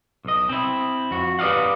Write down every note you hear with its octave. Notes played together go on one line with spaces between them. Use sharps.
B1 D#5
C4 E4
F2 F#4
G4 B4 D5 D#5 F5 F#5